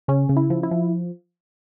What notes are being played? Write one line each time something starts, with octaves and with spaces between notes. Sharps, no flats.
C#3 C#4
C#3
E4
F3
E4
F3